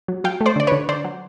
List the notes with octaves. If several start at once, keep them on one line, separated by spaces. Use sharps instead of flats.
F#3
F#3 F5 G5
A3
C5 D5
D3 D5
D3 B4 C#5
D3 C5 D5
F#3